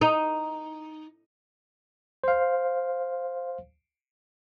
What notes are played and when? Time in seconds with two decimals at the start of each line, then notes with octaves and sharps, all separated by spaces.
0.01 D#4
2.24 C5 F5